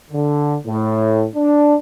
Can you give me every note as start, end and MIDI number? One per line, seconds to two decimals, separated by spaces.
0.11 0.56 50
0.67 1.25 45
1.36 1.75 62